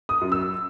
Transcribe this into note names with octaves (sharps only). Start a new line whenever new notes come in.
D#6
F#2
E6